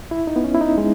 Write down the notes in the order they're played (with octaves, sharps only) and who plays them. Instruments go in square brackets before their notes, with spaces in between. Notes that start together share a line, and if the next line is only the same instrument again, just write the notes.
[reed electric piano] E4
D#4
B3
C#4
E4
D#4
G#3